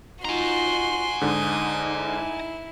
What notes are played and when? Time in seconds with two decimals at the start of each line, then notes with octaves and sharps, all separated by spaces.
0.25 D#4 F4 F#4 G#5 A#5 C6
1.21 G#2 D3 D#4 D#6
2.00 E4